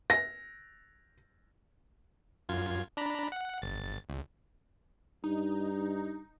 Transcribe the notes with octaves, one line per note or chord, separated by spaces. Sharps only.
A#6
F#2 F4 G#6
D4 A#5 B5
F#5
G1 A6
C#2
G2 D#4